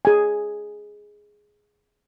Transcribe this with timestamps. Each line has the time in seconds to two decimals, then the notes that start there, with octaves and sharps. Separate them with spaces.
0.05 G#4 G#5